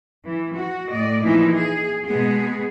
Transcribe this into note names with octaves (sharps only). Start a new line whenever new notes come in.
E3
F#4
A2 D5 D#5
A#2 E3 F3 D#4 E4
G#4
B2 G#3 B3 G#4